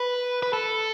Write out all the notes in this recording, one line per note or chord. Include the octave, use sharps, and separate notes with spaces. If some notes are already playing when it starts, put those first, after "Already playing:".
Already playing: B4
B4
A4